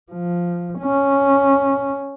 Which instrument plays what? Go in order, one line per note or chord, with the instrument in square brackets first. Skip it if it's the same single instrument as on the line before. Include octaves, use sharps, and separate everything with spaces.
[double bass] F3
C#4